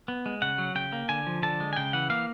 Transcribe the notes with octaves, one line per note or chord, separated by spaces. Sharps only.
B3
G#3
C#3 F#5
F#3
C#3 G5
A#3
D3 G#5
F3
D3 A5
G#3
G#5
C#3 G5
E3 F#5
A#3 F5